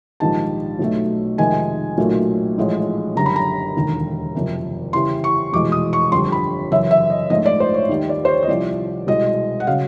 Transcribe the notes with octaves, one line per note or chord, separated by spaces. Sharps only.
A#1 G#2 D#3 G3 A5
B1 B2 F#3 A3
F2 C3 D#3 G#3 G#5
B1 A#2 F#3 A3
A1 A2 F3 G#3
F#1 F#2 D3 G3 A#5
B5
A#5
E1 D#2 D3
F#1 F2 C3
E2 C#3 E3 G3 C6
C#6
F1 E2 B2 G#3 D6
D#6
C#6
G1 F2 D3 G3 C6
B5
F#2 C#3 E3 E5
E5
D#5
A#1 G#2 F3 A3 D#5
D5
C5
C#5
D#2 D#3 G3
D5
C5
C#5
D#5
C2 C3 F3 D5
C2 B2 G#3 D#5
F#5
C#3 F#3 F5